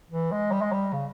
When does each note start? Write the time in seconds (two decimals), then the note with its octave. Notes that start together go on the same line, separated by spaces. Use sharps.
0.11 E3
0.32 G#3
0.51 G3
0.62 G#3
0.72 G3
0.93 C#3